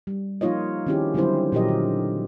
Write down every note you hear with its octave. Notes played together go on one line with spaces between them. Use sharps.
G3
F3 A#3 D#4 F4 C#5 D#5
D#3 C4 C#4 E4 G4 G#4
D3 F#3 G3 C4 E4 C5
A#2 F3 F#3 G4 A#4 D#5
D3